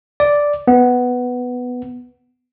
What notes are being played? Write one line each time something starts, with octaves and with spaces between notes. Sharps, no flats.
D5
B3